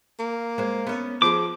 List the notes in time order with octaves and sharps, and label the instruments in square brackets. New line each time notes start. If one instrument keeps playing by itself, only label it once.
[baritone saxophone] A#3
[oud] G#3 C5
B3 C#4
[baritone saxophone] F3 [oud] G#4 B4 [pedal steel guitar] D6